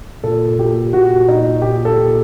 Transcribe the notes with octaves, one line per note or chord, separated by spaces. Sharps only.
A#2 A4
A#2 G4
A#2 F#4
A#2 D#4
A#2 G4
A4
A#2